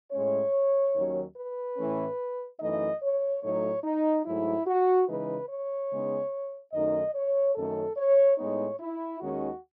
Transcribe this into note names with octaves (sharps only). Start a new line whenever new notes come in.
A2 G#3 C#4 C#5
D#2 D#3 F#3 C#4
B4
A2 E3 A3 C#4
F#2 E3 A3 D#4 D#5
C#5
A2 F#3 A3 D#4 C#5
D#4
G#2 F#3 A3 E4
F#4
C#3 E3 G#3 D#4 B4
C#5
C#3 G#3 B3 D#4
F#2 D#3 A3 D#4 D#5
C#5
F#2 D#3 A3 C#4 A4
C#5
A2 G#3 B3 D#4 C#5
E4
D#2 D#3 G#3 C#4 F#4